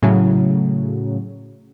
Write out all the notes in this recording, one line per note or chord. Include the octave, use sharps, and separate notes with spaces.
A2 C#3 F#3